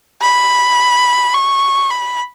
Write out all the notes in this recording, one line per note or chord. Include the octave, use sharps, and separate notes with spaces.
B5
C#6
B5